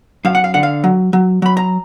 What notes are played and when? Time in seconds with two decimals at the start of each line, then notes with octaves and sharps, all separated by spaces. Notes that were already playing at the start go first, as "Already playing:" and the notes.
0.25 F#2 F5
0.35 F#5
0.44 F5
0.54 D3 F#5
0.63 F5
0.84 F#3
1.13 F#3
1.42 F#3 B5
1.57 A#5